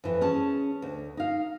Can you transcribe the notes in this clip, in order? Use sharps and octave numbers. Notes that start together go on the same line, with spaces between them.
F2 E3
C#4 G#4 A5
D2
D#4 F5